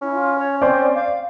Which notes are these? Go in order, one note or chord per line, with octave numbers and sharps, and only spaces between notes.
C#4 E4
F4
C#5
C4 C5 D5
F5